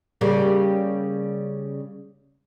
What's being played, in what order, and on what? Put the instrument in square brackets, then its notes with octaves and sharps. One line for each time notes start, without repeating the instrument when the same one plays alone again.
[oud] C#3 G3 A#3